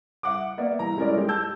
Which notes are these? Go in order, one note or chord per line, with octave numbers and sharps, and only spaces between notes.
E5 F#5 D6
A#3 B3 D5 E5
C2 E3 E4 A#5
G3 G#3 C#4 E4 A#4 D5
G#3 D#4 G4
A5 E6 G6